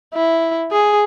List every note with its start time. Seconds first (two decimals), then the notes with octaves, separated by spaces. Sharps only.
0.14 E4
0.72 G#4